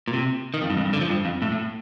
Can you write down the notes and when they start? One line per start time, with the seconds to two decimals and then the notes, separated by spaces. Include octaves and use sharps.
0.08 A#2
0.13 C3
0.54 D#3
0.62 F2
0.70 G2
0.77 F2
0.85 G2
0.93 D3
1.01 F3
1.09 G2
1.25 F2
1.42 A2
1.52 A2